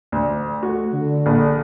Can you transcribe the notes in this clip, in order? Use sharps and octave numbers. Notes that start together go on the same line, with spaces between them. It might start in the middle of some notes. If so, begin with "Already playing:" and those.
D2
A3 F#4
D3
A#1